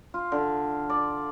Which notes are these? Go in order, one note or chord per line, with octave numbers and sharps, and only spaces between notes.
F4
D3
D5